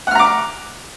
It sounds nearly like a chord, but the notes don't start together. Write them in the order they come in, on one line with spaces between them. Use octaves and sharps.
F#5 F6 A#5 D6